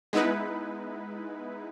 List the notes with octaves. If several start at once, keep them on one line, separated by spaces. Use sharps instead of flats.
G#3 B3 D#4 E4 B4